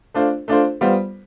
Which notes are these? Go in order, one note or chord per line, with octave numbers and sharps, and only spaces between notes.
A3 D4 F4 C5
A3 D4 F4 C5
G3 B3 F4 C5